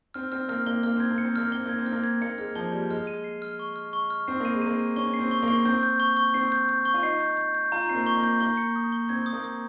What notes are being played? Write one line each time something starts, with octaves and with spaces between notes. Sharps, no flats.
C4 F6
C4 F6
A#3 F6
A#3 G7
A#3 F6
C4 G#6
A#3
C#7
C4
A#3 F6
C4 G7
A#3 G#6
C4
F6
A#3
G#6
A#3 C#7
G#3 F6
F3 G7
G3 G#6
G#3 F6
D#7
C7
F6
C#6
F6
C#6
F6
C4 C7
A#3 D#7
G#3
A#3 D#7
D#7
C#4 C#6
C7
C4
C#6
A#3
C#6
C4 G6
G6
C#6
C#6
C4 C7
G6
G6
C#6
F4
D#4 C7
G6
G6
G6
F4 A#5
C4 C7
A#3
C#6
A#3
G6
A#3 G7
C#7
D#6
G7
C4 G#6
D#6
A#3
D#6